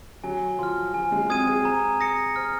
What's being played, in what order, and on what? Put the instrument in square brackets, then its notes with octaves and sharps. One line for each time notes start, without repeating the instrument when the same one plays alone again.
[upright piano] F#3 [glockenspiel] G#5
[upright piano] F3 [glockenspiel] C6 F6
[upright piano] F#3 [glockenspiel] G#5
[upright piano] G#3
[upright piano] C4 [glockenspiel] D#6 G#6 D#7
[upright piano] G#4
[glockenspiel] A#5
D#6 A#6 C#7
[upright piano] C5 [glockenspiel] F6